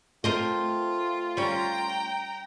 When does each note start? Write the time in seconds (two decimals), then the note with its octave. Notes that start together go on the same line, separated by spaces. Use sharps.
0.24 A3 C4 F4 A#4 C5 D#5
1.37 G3 C#4 G5 A#5